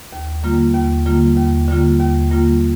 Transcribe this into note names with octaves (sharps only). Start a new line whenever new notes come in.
D#2
D3 G3 A#3 F4
D#2
D3 G3 A#3 F4
D#2
D3 G3 A#3 F4
D#2
D3 G3 A#3 F4